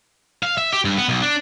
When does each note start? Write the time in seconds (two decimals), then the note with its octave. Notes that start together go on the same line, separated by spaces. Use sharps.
0.43 F5
0.58 E5
0.73 G4
0.85 G2
0.97 B3
1.09 B1
1.22 D4